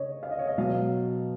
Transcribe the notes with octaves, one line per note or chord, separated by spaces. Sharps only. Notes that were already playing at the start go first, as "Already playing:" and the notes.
Already playing: C#3 C#5 D#5
F5
D#5
C#5
D#5
B2 F#3 F5